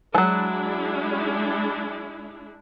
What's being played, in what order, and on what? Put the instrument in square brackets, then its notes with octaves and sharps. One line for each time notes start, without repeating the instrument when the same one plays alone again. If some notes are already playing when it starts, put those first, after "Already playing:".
[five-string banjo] E3 F#3 [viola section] G#3 D4 E4